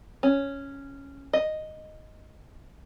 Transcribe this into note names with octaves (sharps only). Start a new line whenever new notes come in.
C#4
D#5